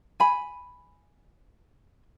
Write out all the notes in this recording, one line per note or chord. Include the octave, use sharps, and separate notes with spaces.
G#5 B5